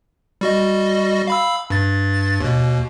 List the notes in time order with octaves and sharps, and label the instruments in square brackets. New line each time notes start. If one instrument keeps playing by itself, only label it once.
[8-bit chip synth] G3 F#4 D#5
F5 B5 E6
G2 A6
D#2 B2